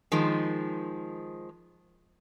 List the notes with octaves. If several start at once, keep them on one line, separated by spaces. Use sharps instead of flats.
D#3 F3 G#3